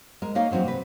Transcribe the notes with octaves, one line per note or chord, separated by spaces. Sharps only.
G#3 A#4
A#3 D#4 C#5 D#5 F5
E3 F#3 C4 D#4 F#4
C3 B4